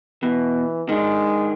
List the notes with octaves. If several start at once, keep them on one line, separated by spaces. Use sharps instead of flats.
B2 E3
D#3 G#3 D4